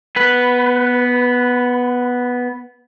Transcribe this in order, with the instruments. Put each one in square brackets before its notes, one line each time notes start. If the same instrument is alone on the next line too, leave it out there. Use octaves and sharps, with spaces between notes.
[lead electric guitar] B3 B4